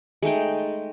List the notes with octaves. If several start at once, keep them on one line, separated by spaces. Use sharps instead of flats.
G#3 A3 D#4 G5